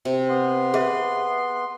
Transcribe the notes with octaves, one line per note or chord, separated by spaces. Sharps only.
C3
B3 C6
G#4 B4 E5